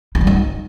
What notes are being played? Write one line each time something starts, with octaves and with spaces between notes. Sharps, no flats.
D#4
G3
D#4